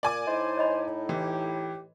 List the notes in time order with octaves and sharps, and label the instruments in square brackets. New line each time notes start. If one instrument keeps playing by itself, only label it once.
[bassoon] A#2 [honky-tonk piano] D5 G#5 D6
[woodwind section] A2 D#4 E4 [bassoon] C5 [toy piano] D#5
[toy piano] C#5 D#5 B5
[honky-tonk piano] E3 [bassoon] G4 [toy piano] B4 C6